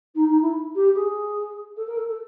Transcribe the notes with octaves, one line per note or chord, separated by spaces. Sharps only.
D#4
D#4
E4
G4
G#4
A4
A#4
A4
A4